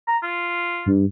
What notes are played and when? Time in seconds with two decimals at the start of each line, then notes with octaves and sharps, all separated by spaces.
0.08 A#5
0.23 F4
0.86 G2